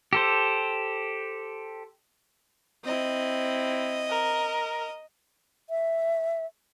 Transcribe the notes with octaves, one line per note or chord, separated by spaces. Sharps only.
G4 A4 C5
C4 E4 D#5
A#4
E5